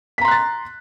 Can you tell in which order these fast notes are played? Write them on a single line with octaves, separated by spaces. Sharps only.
B6 A#5 C6 F#6 A6